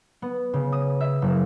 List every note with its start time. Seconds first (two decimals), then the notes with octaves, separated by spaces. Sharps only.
0.22 B3
0.53 C#3
0.72 D#6
1.00 E5
1.22 F#1